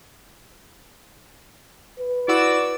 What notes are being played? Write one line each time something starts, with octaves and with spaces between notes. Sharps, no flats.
B4
E4 F#4 D5 E6